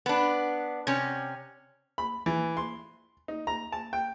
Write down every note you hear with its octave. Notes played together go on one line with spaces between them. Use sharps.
B3 D4
C3 C#4
B5
E3
C6
D#4
A#5
A5
G5